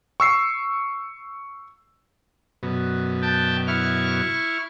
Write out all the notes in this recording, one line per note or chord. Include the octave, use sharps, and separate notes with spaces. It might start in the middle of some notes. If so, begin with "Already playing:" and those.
C#6 E6 C7
F#2 B2
G5 A5
E4 C#6 F6